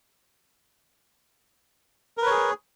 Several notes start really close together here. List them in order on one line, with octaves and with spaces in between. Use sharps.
A#4 B4 C#5 G#4